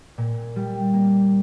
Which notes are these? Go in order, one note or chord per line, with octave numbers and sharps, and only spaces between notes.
A#2
G3
A#3